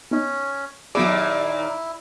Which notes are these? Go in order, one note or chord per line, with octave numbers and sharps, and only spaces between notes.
B3 C#4 D#4 D#5
D#2 A#2 F#3 B3 E4 G#4 D5